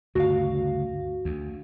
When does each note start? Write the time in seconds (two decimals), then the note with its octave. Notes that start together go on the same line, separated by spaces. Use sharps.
0.15 D2 G2 C#3 F#4 F5
1.25 D2